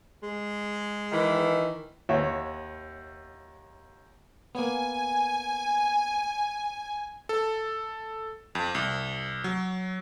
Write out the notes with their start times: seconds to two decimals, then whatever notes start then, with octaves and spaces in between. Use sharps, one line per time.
0.22 G#3
1.12 D#3 E3
2.09 D#2 F#4 C#5 E5
4.55 A#3 B3 G#5
7.29 A4
8.55 F2
8.75 C2
9.44 F#3